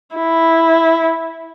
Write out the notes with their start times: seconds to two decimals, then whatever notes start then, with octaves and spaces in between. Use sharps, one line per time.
0.16 E4